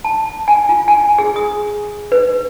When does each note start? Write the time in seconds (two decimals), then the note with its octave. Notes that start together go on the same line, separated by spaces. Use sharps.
0.04 A5
0.48 G#5
0.69 F4
0.88 G#5
1.18 G#4
1.36 D#6
2.12 B4